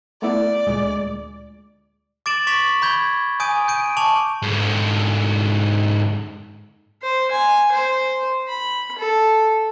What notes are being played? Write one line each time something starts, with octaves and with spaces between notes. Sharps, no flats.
A3 B3 E4 D5
D2 A#2 G#3
D6 A6 D7 E7 F#7
C#6 D6 A6 B6 F7 F#7
B5 G6 G#6 G7
G#5 D#6 G6 D7 D#7
G6 D7 D#7
A5 C#6 D6 F7 F#7
G#2 D3
C5
G#5
C5
B5
A4